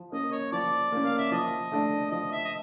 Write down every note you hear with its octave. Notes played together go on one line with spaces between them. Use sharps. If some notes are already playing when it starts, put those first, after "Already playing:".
Already playing: F3
A#3 C#4 D#5
C#5
F3 D5
A#3 C#4
F5
E5
F3 D#5
A3 D4
F3 D#5
E5
D#5